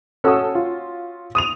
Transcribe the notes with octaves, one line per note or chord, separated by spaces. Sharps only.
C#4 F#4 A4 D#6 E6
F4
D#6 D#7 F7